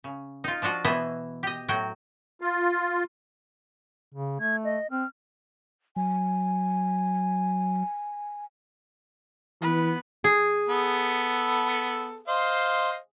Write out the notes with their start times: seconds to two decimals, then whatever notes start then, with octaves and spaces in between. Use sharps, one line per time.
0.04 C#3
0.44 D#4 F4
0.62 F3 D4 F4 F#4
0.85 B2 E3 B3 E4 C5 D#5
1.43 G4 D#5
1.68 A2 F#3 F#4 G5
2.41 F4
4.14 C#3
4.41 A3 G#6
4.65 D#5
4.91 C4 F6
5.96 F#3 G#5
9.62 E3 B3 B4
10.24 G#4
10.69 B3 A4
12.28 C5 D#5 F5